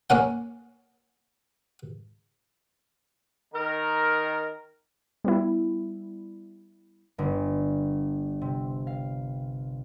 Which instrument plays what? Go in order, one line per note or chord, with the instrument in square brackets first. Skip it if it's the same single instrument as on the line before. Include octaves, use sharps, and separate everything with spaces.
[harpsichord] A#3 C#4 F#5
[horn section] D#3 A#4
[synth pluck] G3 B3 E4
[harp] G1
C3
F5